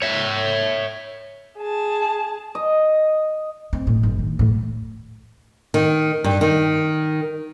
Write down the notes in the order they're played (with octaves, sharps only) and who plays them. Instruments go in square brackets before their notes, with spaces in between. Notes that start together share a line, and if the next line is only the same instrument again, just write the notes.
[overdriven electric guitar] C#5 E5
[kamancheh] G#4 A5
[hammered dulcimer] D#5
[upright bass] C4
A2
G1
D#3
A2 E3
[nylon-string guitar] D#3
G2
D#3